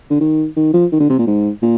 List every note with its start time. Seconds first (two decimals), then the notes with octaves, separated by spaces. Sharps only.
0.10 D3
0.20 D#3
0.56 D#3
0.73 F3
0.92 D#3
1.00 D3
1.10 C3
1.19 A#2
1.27 G#2
1.62 A#2